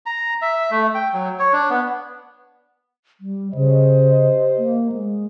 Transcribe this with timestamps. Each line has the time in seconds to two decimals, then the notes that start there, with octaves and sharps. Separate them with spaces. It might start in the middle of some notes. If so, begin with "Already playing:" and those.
0.06 A#5
0.42 E5
0.71 A3
0.95 G5
1.13 F#3
1.39 C#5
1.53 D4
1.70 B3
3.20 G3
3.55 C#3 G4 C5 D#5
4.58 A#3
4.92 G#3